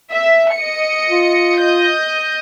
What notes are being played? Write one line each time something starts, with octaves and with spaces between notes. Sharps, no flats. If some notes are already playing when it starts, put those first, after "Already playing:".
E5
D#5 C#7
F4
D#5 G6